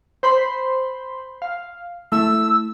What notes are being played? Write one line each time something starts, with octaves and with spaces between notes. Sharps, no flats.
C5 B5 C6
F5
A3 E4 E6